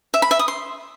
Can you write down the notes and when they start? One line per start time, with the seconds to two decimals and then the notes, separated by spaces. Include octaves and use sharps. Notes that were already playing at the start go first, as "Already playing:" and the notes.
0.14 E5
0.22 B5
0.31 E5
0.39 D#6
0.48 C6